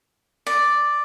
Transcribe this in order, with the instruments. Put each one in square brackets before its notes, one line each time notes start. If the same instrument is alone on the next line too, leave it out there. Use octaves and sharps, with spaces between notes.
[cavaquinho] D5